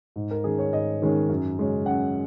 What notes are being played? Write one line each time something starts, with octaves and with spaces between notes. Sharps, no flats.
G#2
A#4
D#3 G#3 C#4 G#4
C#5
G#2 D#5
D#3 G#3 C#4
F#2
C#3 G#3 C#4
F#2 F#5